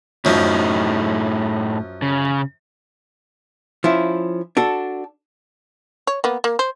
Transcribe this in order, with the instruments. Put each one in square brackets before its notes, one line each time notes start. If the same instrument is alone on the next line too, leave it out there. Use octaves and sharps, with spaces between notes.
[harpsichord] F#2 F3 [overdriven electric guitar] A2 D#4
[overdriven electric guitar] C#3
[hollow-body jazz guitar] F3 C#4 E4
D4 F#4 A4
[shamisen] C#5
A#3 B3
A#3
C5